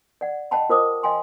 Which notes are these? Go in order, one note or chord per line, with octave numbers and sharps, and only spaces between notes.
D5 F#5
C#5 D#5 F#5 G5 A5 B5
F4 A#4 C5 D#5 D6 D#6
D#5 F5 G5 G#5 C6